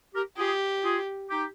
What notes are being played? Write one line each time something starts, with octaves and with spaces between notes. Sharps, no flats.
G4 A#4
F4 G4 G#4
F4 G#4
D#4 G4